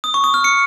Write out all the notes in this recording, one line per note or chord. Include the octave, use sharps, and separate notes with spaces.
D#6
C#6
D#6
F6
C#7